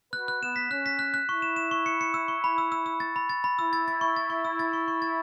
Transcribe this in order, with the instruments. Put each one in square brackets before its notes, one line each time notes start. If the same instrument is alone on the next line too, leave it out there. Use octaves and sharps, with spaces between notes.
[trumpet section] F#4 B4 [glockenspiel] F#6
[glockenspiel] F#6
[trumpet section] B3 [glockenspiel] E7
[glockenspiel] B6
[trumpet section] C#4 [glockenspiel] F#6
[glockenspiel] B6
F#6
F#6
[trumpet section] E4 [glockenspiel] C#6
[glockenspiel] E7
E7
C#6
C#7
C#7
E6
C#6
B5
E6
E6
E6
A6
B5
A6
B5
[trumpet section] E4 [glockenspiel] E6
[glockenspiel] A6
A6
C#6
A6
C#6
E6
A6
C#6
C#6
A6